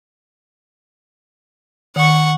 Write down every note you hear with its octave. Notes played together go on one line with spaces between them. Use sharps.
D#3 F#5 C#6